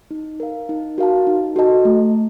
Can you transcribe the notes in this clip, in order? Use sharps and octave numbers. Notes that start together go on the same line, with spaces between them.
D#4
A#4 F5
D#4
F#4 A#4 F5 A5
D#4
F#4 A4 D#5 A5
A3